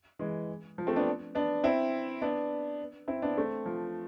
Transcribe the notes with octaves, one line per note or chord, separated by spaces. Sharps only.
E3 G#3
F3
A3 C4
B3 D4
B3 D4
C4 E4
B3 D4
C4 E4
B3 D4
A3 C4
F3